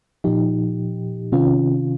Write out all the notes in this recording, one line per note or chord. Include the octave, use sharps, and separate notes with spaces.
A#2 F3 D#4 G4
C3 D#3 C#4 F4